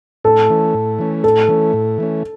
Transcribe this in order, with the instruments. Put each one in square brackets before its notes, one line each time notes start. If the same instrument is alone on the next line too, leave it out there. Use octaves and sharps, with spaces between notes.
[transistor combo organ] A2 [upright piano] A4
[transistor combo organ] E3 A3 C#4
A2
E3 A3 C#4
[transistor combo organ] A2 [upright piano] A4
[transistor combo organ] E3 A3 C#4
A2
E3 A3 C#4